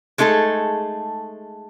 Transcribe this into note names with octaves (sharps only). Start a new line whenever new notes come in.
G#3 A3 D#4 G#4 A4